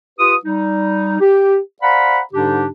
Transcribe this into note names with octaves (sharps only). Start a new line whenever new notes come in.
F4 G4 B4 D#6
G3 D#4
G4
C5 D5 F5 F#5 A#5 B5
G#2 D3 G3 D4 D#4 G4